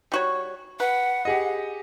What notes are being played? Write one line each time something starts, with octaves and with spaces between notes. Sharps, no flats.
G3 F#4 C#5
B4 F#5
G4 G#4 D#5